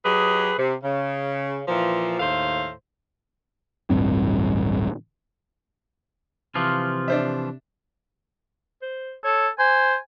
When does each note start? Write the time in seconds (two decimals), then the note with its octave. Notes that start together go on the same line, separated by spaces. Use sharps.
0.05 F#3 G4 G#4 B4 D#5
0.59 C3
0.84 C#3
1.68 A#2 E3 F3
2.20 D#2 A2 A3 C5 F5
3.90 D1 A1 G2 C4
6.55 C3 E3 F3 F4
7.08 D4 C5 E5
8.82 C5
9.24 A4 C#5
9.59 C5 G#5